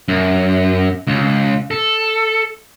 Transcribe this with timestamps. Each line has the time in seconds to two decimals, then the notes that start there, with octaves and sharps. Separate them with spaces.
0.08 F#2
1.07 C#2
1.71 A4